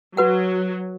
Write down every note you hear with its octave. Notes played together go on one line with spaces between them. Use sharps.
F#3 F#4 B4 F#5